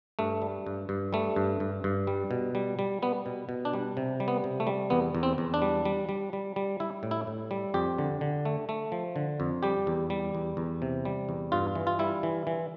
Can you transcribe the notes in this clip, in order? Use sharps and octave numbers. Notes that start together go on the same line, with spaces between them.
G2 A3
G3
G2
G2
G3 A3
G2
G2
G2
G3
B2
G3
G3
G3 B3
B2
B2
D4
G3
C3
G3
B3
C3
A3
G3
E2 B3
E2
C4
E2
D4
G3
G3
G3
G3
G3
G3 E4
A2
E4
A2
G3
F2 G4
D3
D3
A3
A3
F3
D3
F2
G3 G4
E2
G3
E2
E2
C3
G3
E2
G2 F4
E3
F4
G3 E4
E3
E3